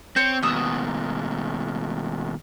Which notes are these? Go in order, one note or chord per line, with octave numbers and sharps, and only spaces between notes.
C4 C5 C#5
D#2 B2 A#5 D#6 E6